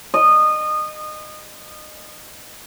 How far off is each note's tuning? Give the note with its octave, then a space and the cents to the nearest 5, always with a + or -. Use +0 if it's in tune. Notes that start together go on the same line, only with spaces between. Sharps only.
D#5 -25